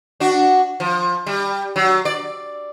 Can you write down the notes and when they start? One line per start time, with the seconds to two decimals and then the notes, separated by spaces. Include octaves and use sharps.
0.20 D4 F#4
0.80 F3
1.26 G3
1.76 F#3
2.05 D5